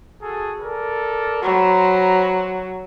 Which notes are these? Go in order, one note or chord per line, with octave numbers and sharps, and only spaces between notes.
F#4 G#4 A4
A4 A#4 D5
F#3 C5 A#5 B5